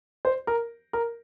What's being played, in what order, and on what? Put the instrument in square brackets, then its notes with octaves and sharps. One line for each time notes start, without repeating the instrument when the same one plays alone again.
[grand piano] C5
A#4
A#4